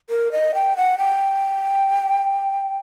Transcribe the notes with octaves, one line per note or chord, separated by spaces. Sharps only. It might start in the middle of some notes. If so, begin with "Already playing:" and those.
A#4
D#5
G5
F#5
G5